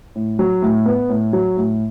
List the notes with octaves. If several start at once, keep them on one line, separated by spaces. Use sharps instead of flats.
A2
F#3
A2
B3
A2
F#3
A2